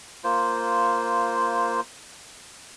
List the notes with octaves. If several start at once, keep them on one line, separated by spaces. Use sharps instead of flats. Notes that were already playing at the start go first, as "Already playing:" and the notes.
A#3 F4 C5